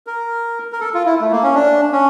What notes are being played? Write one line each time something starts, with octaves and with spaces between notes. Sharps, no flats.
A#4
A#4
A4
F4
E4
A3
A#3
C#4
D4
C#4